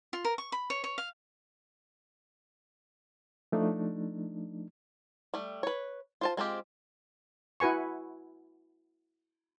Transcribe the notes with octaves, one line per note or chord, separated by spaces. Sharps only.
F4
A#4
C#6
B5
C#5
C#5
F5
F3 A3 D4 D#4
G3 A3
B4 C#5
F4 C5 A5
G#3 C4 F4 G4
E4 F#4 B4 G#5 C#6